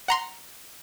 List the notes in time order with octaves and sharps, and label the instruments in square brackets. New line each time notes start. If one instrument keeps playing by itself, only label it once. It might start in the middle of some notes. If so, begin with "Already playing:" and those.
[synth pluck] F#5 A#5 C6